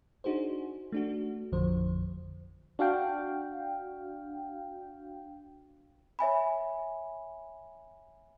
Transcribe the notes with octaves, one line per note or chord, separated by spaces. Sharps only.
D4 D#4 F#4 G#4 C5
A3 D4 F#4
A1 F2 D3 F3 C5
D4 F#4 F5 G5
C#5 E5 G#5 B5